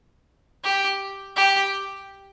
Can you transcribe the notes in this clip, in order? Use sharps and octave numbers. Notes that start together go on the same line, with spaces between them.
G4
G4